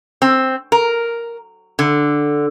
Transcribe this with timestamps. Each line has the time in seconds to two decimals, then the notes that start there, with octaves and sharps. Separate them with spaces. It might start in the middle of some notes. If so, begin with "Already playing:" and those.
0.22 C4
0.72 A#4
1.79 D3